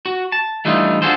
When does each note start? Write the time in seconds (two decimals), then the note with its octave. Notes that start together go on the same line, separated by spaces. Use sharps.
0.06 F#4
0.32 A5
0.65 E3 G3 A3 D4 D#4 F4
1.02 D4 F4 F#4 G#4 A4 C5